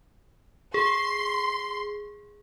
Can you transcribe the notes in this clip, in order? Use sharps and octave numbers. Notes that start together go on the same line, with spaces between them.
G#4 C6